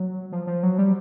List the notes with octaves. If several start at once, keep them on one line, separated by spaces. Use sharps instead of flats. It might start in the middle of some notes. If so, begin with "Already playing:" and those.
Already playing: F#3
F3
F3
F#3
G3